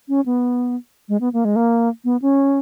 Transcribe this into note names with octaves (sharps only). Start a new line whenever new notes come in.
C#4
B3
G#3
B3
A#3
G#3
A#3
B3
C#4